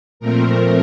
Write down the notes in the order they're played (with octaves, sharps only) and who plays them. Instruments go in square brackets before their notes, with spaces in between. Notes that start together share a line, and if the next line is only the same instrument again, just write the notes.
[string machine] A#2 F3 A3 C4 A#4